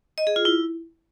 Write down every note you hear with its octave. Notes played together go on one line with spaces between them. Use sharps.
D#5
G#4
F4
E4